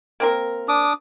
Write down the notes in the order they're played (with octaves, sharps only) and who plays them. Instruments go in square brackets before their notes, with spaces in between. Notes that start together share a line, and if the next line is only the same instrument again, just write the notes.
[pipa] A#3 C4 A#4
[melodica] D4 D6 D#6